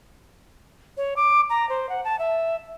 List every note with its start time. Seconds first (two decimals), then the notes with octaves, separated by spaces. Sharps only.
0.97 C#5
1.17 D6
1.50 A#5
1.69 C5
1.89 F#5
2.05 A5
2.19 E5